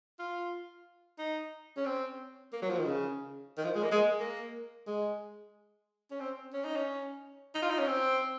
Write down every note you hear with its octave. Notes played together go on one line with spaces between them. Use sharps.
F4
D#4
C#4
C4
A#3
F#3
F3
D#3
C#3
D#3
F3
G#3
A#3
G#3
A#3
G#3
C#4
C4
C#4
D#4
C#4
D#4
F4
D#4
C#4
C4